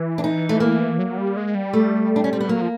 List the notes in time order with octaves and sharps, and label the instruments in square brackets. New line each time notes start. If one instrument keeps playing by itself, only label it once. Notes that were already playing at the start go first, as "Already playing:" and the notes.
Already playing: [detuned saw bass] E3
[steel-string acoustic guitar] D4
D#4
A3
A#3
[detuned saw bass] F#3
G3
G#3
G3
[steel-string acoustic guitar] A3
D4
C#4
C4
B3
[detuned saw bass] F#3 [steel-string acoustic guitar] A#3
[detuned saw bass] F3